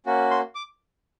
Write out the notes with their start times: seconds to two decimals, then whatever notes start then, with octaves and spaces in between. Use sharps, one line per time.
0.06 A#3 C#4 F#4
0.31 C6
0.55 D6